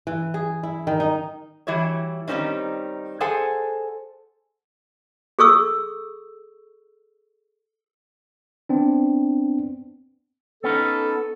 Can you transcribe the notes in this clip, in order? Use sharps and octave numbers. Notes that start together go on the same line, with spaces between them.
E3
G#4
E4
D#3
D#4
E3 G3 E4 F#4 C#5
D#3 G3 G#3 C4 C#4 D#4
G#4 A4 C5 F#5 G#5
G#4 A4 C#6 E6
B3 C4 D4
B3 C#4 D#4 A4